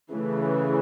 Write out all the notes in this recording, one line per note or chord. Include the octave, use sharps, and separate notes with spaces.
C#3 E3 A3